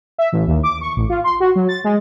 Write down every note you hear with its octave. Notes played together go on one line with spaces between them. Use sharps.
E5
A1
D#2
D6
C#6
A1
F4
C6
F#4
F#3
A6
G#3